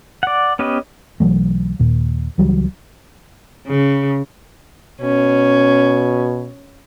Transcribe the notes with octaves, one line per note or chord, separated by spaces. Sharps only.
D5 F#5
B3 C#4 G4 B4 D#5
B1 E3 F#3 A3
D#2 A#2
C#2 E3 F#3 G3
C#3
B2 C#4